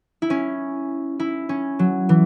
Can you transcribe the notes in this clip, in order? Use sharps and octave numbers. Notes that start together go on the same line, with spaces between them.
E4
C#4
E4
C#4
F#3
E3